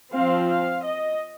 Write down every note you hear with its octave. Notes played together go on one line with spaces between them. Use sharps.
F3 C4 F5
F5
D#5